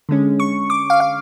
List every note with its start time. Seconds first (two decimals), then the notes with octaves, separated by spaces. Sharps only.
0.09 D3 G#3 C#4
0.40 C#6
0.70 D6
0.90 F5
1.00 F5